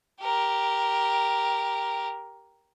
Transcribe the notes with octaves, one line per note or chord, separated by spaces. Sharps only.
G4 A#4